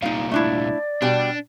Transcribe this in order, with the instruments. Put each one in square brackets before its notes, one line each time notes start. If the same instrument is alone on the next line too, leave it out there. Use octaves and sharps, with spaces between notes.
[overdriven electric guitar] C2 A#2 [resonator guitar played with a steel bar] D#4 F5
[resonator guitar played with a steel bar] A3 D4 E4 [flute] D5
[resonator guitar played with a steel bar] B2 G3 G5 [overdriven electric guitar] D4